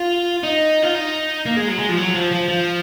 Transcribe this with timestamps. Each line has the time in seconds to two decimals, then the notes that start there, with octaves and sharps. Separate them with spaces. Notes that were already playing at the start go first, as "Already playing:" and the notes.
Already playing: F4
0.44 D#4
0.83 F4
0.95 D#4
1.46 A#3
1.57 G#3
1.68 F#3
1.79 G#3
1.89 F3
1.97 F#3
2.14 F3
2.31 F3
2.48 F3